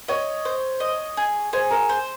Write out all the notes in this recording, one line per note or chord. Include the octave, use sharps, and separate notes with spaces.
C#5 D#5
C5
D#5
G#4
G#4 C5
A#4
C5